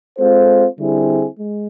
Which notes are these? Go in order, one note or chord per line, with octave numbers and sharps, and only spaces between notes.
G#3 C4 F4 A4 C5
D3 G3 C4 E4 G#4
G#3